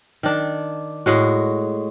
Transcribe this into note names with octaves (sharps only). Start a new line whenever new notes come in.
D#3 D4
A2 G#3 F#4